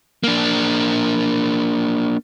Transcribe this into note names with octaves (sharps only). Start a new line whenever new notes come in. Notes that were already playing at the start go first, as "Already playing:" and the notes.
A#3 D4